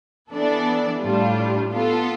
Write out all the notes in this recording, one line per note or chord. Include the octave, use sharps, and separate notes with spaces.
E3 B3 D4 A4 D5
A2 G3 D4 F4
B3 F4 A4